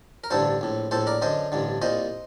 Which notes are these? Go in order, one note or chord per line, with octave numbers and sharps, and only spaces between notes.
A#4
A1 G2 D3 A4 C5
A#1 A2
A#1 A2 A4 C5
A#4 D5
F#2 D3 C5 D#5
A1 G2 D3
C2 A#2 C5 D#5